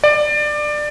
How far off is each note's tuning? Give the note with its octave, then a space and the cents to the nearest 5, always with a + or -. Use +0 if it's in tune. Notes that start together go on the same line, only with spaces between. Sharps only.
D5 +20